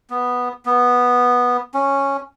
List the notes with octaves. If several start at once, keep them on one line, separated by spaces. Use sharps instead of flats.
B3
B3
C#4